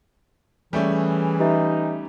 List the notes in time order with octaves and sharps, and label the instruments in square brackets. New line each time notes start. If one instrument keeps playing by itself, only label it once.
[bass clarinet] E3 [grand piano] G3 A3 C#4 [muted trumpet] G#4
[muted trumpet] D#4 [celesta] G4 B4 E5